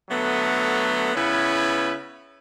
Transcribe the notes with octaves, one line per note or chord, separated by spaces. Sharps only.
D3 F#3 A3 B3
C#3 B3 C#4 E4 B4